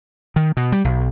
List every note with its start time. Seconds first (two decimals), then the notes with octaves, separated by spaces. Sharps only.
0.36 D#3
0.57 B2
0.72 G3
0.84 B1